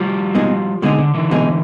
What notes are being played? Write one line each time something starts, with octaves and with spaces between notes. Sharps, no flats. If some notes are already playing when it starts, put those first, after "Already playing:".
Already playing: F3 G3
B2 G#3 C4 D#4 G#4
B2 D3 G#3 C4 D#4 G#4
D3
D3 E3
B2 G#3 C4 D#4 G#4